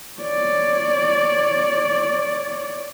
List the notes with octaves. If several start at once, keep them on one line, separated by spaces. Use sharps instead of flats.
C#5 D5